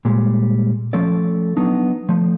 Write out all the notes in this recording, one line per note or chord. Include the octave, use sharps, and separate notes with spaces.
A#2 G3 G#3
F3 A3 C#4 A4 D5
F#3 B3 D4 D#4
F3 A3